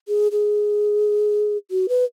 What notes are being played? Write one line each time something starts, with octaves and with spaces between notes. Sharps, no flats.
G#4
G#4
F#4
B4